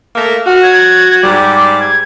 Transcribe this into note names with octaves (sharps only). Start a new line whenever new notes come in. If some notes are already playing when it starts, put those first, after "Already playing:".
A3 A#3 A#4
F#4 F6
G#6
G#2 G3 D6
G#6